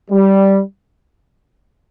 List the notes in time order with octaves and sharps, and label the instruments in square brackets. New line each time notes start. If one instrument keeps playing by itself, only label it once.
[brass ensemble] G3